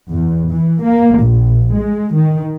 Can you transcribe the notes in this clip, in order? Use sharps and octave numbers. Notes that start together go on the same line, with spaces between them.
E2
E3
A#3
A#1
G#3
D#3